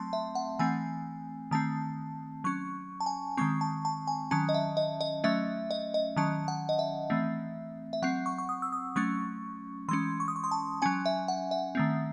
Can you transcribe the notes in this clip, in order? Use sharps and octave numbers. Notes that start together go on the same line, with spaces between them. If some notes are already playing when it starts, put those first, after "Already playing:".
Already playing: F#3 A3 C4 A5 C6
E5
F#5
E3 A3 C4 G#5
D#3 A3 C4 A5
F#3 C#4 C#6
A5
G#5
D#3 G#3 C4 C#6
A5
A5
G#5
D#3 F#3 C#4 A5
D#5
E5
D#5
D#5
F#3 A3 C#4 E5
D#5
D#5
D#3 F#3 C#4 A5
F#5
D#5
E5
E3 A3 C4
E5
F#3 C4 F#5
C#6
C#6
D#6
E6
D#6
F#3 A3 C#4 C#6
E3 G#3 C#4 C6
C#6
D#6
C#6
C6
A5
F#3 C#4 G#5
E5
F#5
E5
D#3 A3 C4